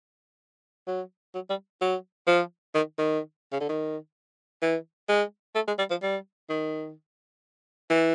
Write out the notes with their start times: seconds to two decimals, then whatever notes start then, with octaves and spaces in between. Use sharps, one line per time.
0.87 F#3
1.35 F#3
1.50 G3
1.81 F#3
2.27 F3
2.75 D#3
2.98 D#3
3.52 C#3
3.60 D3
3.69 D#3
4.62 E3
5.09 G#3
5.55 A3
5.67 G#3
5.79 G3
5.90 F3
6.02 G3
6.49 D#3
7.90 E3